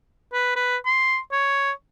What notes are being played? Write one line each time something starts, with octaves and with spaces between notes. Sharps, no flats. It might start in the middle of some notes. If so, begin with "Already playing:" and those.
B4
B4
C6
C#5